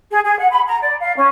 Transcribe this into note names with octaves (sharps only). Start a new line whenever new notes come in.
G#4
G#4
F#5
B5
A#5
D5
F5
C#4